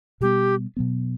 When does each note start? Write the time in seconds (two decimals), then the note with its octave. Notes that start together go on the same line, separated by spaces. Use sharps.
0.21 B2 G3 B3 G4
0.77 B2 F#3 B3